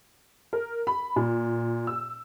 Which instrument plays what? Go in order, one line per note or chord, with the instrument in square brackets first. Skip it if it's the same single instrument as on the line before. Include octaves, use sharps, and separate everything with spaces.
[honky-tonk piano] A#4
B5
A#2
E6